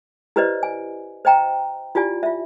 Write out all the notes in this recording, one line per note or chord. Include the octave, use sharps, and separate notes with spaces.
E4 G4 B4 C5 D5 D#5
G#5
C5 D#5 G5 A#5
E4 F4 G4 D5 G#5
F4 E5